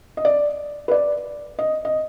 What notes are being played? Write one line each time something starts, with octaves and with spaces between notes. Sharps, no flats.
D#5
D5
B4
D5
D#5
D#5